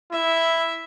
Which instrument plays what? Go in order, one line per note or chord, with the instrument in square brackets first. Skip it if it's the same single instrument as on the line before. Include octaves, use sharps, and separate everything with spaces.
[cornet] E4 [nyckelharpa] E5